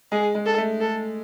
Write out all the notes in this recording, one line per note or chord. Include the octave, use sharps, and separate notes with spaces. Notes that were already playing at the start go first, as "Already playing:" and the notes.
G#3 G#4
G#3
A4
A3
A4